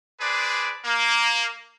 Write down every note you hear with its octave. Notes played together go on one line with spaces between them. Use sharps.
D4 G#4 B4 C5 D5
A#3